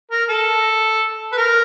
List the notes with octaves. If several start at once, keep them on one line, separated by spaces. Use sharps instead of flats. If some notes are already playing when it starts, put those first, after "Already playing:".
A#4
A4
B4
A#4